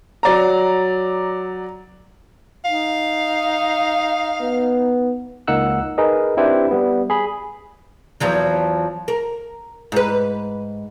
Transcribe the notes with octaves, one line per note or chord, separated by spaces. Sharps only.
F#3 D5 A#5
D#4 F5
B3
C#2 A#3 D#4 F#5 E6 F#6
D#4 G#4 A#4 B4 D#5
C4 D4 E4 G4 B4 C5
G3 B3
G#4 B5
E2 F3 F#3
A#4
G#2 B4